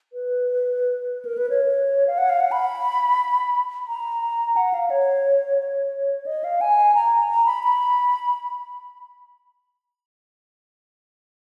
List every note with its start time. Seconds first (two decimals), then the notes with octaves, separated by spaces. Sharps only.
0.13 B4
1.25 A#4
1.38 B4
1.50 C#5
2.07 F5
2.18 F#5
2.29 F5
2.40 F#5
2.52 B5
3.88 A#5
4.56 F#5
4.74 F5
4.90 C#5
5.58 C#5
6.26 D#5
6.44 F5
6.61 G#5
6.95 A#5
7.28 A#5
7.46 B5
7.63 B5